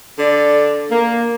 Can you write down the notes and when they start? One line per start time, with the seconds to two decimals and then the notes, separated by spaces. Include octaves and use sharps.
0.17 D3 D5
0.90 A#3